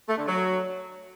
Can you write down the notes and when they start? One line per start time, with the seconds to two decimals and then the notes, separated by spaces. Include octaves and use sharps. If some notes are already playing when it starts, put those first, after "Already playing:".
0.09 A3
0.18 D3
0.26 F#3